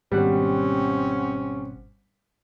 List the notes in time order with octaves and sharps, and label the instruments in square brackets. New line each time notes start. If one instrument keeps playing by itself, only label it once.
[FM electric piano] G#1 B2 F#5 [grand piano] G3 [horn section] C4 C#4